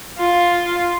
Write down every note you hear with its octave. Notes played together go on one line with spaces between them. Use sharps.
F4